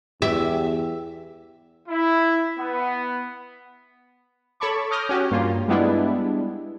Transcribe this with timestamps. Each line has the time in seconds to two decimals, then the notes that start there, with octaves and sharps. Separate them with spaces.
0.22 E2 G4 E5
1.88 E4
2.59 B3
4.60 A4 C#5 A5 B5 C#6 D6
4.91 D6 D#6 F6 G6 A#6
5.09 C#4 F#4 G4
5.31 G2 A#3 F4
5.68 G3 G#3 B3 D4 E4